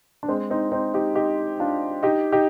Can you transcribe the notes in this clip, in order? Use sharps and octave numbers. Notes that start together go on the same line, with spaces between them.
D4
G#3 C4
C4 D#4
C4 D#4
D#4 G4
D#4 G4
D4 F4
D#4 G4
D#4 G4